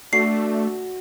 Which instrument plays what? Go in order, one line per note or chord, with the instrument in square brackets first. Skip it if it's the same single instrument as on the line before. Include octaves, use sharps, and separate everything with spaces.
[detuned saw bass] A3 [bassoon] D4 [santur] F#4 [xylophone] C7